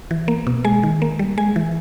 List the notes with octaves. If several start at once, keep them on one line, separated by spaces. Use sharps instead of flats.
E3
A#3
B2
G#3 G#5
D#3
A#3
G3
G#3 G#5
E3